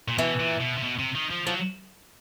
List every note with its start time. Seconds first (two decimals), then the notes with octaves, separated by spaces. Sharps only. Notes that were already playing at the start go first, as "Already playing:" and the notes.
0.08 A#2
0.18 B2 E3
0.40 A#2
0.61 B2
0.78 C3
0.83 B2
0.99 C3
1.15 D#3
1.30 F3
1.47 F3 F#3